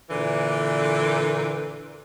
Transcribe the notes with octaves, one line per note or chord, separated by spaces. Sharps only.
A#2 D3 E3